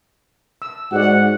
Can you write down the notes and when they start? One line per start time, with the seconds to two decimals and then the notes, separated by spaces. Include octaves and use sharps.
0.62 E6
0.92 G#2 F#4 A4 D5 F#5